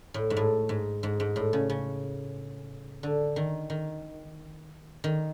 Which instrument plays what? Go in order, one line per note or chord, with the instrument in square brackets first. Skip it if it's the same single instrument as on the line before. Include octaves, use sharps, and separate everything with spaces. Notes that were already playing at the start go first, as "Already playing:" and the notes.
[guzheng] A2
G#2
A2
G#2
G#2
G#2
A2
C#3
C#3
D3
D#3
D#3
D#3